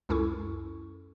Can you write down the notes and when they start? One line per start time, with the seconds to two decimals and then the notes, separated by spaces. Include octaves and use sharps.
0.09 C#2 F#2 C#4 E4 A4 C#6